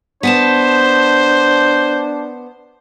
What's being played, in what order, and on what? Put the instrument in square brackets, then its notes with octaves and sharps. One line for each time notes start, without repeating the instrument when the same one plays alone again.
[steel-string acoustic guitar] B3 G#5 A5 [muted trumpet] D4 [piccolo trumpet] C5